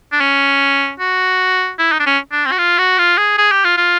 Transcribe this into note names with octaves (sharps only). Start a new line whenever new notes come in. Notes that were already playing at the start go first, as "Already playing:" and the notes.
D4
C#4
F#4
E4
D#4
D4
C#4
D4
C4
F#4
F4
F#4
F4
G#4
G#4
G4
F4
F4